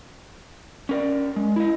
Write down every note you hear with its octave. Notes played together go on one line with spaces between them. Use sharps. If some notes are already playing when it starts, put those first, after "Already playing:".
C#4 A#4 D5
G#3
E4 D#5